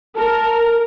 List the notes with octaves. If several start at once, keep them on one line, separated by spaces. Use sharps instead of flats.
A#4 A5